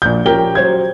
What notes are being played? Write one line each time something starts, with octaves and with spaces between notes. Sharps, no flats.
A#1 G6
F3 C#4 G4 A#4 G5 G7
F#3 C5 C#5 G#6